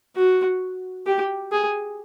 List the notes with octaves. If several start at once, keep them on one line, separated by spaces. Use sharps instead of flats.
F#4
G4
G#4